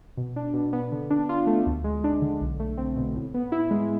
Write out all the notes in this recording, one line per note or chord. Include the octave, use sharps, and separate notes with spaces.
B2
D4
B2
B3
D3
D4
F4
A3
D2
G#3
D4
D3
B1
A3
C4
B2
A2
B3
E4
G#3